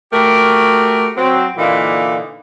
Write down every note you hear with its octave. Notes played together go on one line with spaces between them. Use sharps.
A3 F#4 G4 A#4
F#3 C4
A#2 D3 E3 A#3 D#4